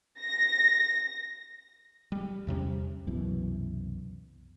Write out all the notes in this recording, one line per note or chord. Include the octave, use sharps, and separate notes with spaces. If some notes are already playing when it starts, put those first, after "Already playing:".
A#6
G3
E2 C3 G3 C#4
C2 F#2 B2 E3